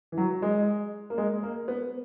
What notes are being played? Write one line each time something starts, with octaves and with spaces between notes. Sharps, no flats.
E3
F#3
G#3
A#3
G#3
A#3
B3